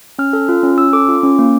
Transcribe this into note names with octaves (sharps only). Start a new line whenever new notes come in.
C#4 F6
A4
F4
C#4
C#4 E6
A4 D6
F4
C#4
A#3